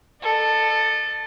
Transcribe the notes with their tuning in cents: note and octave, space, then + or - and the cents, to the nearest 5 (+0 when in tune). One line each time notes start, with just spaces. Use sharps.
A4 +5 D#5 -45